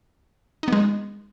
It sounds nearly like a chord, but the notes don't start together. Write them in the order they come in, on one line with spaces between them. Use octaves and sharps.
D#4 B3 G#3